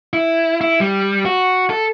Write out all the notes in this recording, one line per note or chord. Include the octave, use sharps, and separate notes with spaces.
E4
E4
G3
F#4
A4